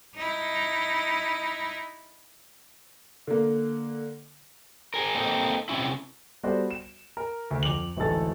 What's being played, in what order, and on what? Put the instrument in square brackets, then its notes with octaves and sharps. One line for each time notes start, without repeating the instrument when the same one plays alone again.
[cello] D#4 E4
[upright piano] D3 A#3
[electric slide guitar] G#4 A#4
A#3 C4 D#4 A4
C3 E3 F#3 C#4 E4
[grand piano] G3 B3 F#4 A4 C5 D5
E7
A#4
D2
F2 D6 F7 F#7
D1 A1 G#2 E3 A4 A6